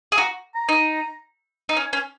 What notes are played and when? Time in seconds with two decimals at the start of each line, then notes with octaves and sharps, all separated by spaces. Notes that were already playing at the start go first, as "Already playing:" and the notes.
0.12 G#4
0.18 F#4 A#5
0.55 A#5
0.69 D#4
1.69 D#4
1.77 C#4
1.93 C#4